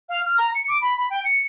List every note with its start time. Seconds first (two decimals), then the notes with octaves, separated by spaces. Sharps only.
0.09 F5
0.26 F6
0.38 A#5
0.55 C#7
0.68 D6
0.82 B5
0.98 B5
1.10 G5
1.25 C#7